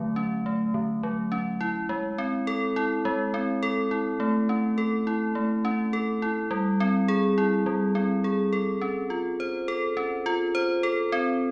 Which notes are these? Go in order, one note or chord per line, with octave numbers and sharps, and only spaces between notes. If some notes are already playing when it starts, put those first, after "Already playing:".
Already playing: D3 F#3 A3
C#4
A3
D3
F#3
C#4
E4
G#3
C4
A4
E4
G#3
C4
A4
E4
A3
C#4
A4
E4
A3
C#4
A4
E4
G3
C4
G#4
E4
G3
C4
G#4
A4
C#4
F4
C5
A4
C#4
F4
C5
A4
C4